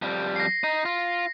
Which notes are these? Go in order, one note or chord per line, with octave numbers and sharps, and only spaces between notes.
F2 G3
A#6 C7
D#4
F4